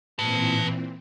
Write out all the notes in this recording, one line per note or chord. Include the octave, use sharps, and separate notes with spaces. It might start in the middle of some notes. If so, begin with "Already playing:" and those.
A#2 E3 C4 B4 A5